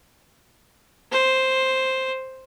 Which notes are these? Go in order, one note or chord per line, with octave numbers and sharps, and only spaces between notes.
C5